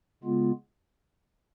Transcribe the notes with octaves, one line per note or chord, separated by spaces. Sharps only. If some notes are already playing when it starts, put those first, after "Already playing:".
C#3 G#3 B3 F4